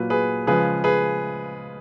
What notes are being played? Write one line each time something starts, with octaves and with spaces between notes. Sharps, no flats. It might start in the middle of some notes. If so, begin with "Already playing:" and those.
Already playing: A#2 F#3 B4
G#4 B4
C#3 F3 G#3 G#4 B4
G#4 B4